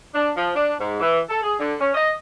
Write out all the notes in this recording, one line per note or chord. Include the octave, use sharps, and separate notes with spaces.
D4
F3
D4
G#2
E3
A4
G#4
D3
C#4
D#5